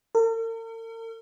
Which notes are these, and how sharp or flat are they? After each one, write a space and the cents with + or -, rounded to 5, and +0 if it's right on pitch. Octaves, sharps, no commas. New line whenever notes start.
A#4 -45